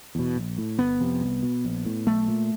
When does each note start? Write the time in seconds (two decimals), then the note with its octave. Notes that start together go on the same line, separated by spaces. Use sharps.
0.15 E2 B2
0.36 A#1
0.58 A2
0.78 G1 B3
1.00 F2 C3
1.21 C2
1.42 B2
1.64 A#1
1.85 A2
2.07 B1 A3
2.28 A#2